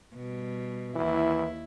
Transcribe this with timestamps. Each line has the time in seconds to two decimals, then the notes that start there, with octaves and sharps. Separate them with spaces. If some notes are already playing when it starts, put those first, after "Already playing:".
0.16 B2 G3
0.96 D#2 E3 E4